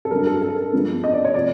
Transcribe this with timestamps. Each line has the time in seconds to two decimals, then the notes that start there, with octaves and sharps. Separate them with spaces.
0.05 A4
0.11 G2 D3 F#3 A#4
0.27 A4
0.42 A4
0.57 A4
0.73 G2 D3 F3 G#3 B3
1.04 D#5
1.14 D5
1.24 C#5
1.34 C3 F3 A3 D5